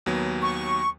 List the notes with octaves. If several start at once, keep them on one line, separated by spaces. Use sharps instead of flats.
D#2 F#3 B3
C#6